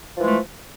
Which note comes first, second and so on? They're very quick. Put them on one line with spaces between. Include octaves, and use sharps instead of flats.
F3 E3 G#3 A3